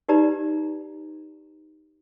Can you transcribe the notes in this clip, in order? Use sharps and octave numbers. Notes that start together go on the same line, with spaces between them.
D#4 G4 B4 D5 A#5